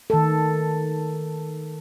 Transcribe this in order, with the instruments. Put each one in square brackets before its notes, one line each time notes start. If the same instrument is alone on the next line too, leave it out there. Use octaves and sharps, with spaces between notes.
[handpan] D#3 A4